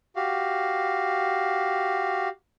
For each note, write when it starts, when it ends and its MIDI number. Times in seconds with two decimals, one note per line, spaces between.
0.16 2.28 66
0.16 2.28 67
0.16 2.28 77